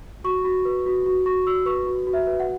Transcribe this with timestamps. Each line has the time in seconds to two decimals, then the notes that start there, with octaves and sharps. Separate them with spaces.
0.24 F#4 C#6
0.45 F#4
0.65 B4
0.86 F#4
1.06 F#4
1.26 F#4 C#6
1.47 F#4 E6
1.66 B4 C#6
1.87 F#4
2.07 F#4
2.13 E5
2.27 B4
2.40 F#5